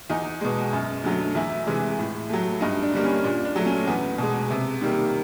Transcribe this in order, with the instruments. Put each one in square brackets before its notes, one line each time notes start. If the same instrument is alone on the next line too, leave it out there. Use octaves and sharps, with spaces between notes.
[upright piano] E2 D#4
B2 G#3
F#2
D3 F#3 A3
E2 E4
C3 E3 G#3
A2
F#3 A3
G2 D#4
D4
D3 G3 A#3
C#4
A#2 D4
D4
F#3 A3
C#4
E2 B3
B2 G#3
C3
D#3 G3 A#3